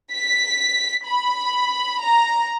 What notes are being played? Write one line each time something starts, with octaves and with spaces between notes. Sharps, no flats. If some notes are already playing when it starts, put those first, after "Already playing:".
B6
B5
A#5